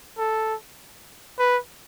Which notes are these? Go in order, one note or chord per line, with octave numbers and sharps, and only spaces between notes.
A4
B4